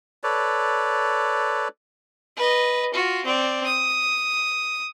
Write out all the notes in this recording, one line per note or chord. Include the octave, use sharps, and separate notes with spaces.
A4 B4 C#5 D5
B4 D#5
F4 F#4
C4 D5
D#6